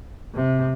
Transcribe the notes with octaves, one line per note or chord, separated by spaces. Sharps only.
C3